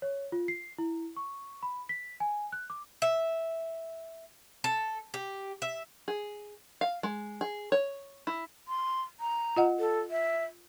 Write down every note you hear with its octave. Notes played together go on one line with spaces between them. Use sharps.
C#5
F4
C7
E4
C#6
B5
B6
G#5
F#6
D6
E5
A4
G4
E5
G#4
F5
G#3
G#4
C#5
E4
C6
A#5
F4 D#5 F#5
A4
E5